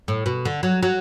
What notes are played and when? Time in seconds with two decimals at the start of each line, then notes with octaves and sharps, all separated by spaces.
0.08 A2
0.26 B2
0.45 D3
0.63 F#3
0.83 F#3